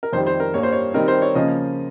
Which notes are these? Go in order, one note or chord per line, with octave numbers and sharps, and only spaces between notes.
A#4
F2 D#3 G3 C5
C5
A#4
G2 G3 A#3 C#5
C5
C#5
D#3 G3 C4 D#4 A#4
C5
C#5
C#3 F3 A#3 C#4 D#5